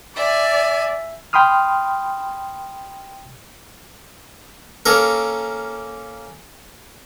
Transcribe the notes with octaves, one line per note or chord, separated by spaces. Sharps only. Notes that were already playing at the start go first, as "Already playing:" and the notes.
D5 E5 G#5
G5 B5 C6 D#6 F6
A#3 C#4 A4 A#4